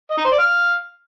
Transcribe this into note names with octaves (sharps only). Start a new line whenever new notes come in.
D#5
D#4
C5
D5
F5